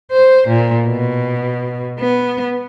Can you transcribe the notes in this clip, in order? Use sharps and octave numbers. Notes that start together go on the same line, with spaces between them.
C5
A#2
B2
B3